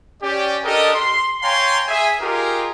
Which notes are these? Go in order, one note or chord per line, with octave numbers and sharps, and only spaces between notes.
C#4 G4 D5
D4 G4 A4 A#4 D#5
C6
C#5 F5 G5 G#5 A#5 C6
G#4 E5 G#5
D#4 F4 G4 G#4 A#4